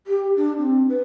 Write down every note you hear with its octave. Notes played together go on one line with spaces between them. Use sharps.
G4
D4
C4
B4